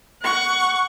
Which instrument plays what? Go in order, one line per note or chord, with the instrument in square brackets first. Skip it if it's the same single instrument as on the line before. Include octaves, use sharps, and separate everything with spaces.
[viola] F#5 C#6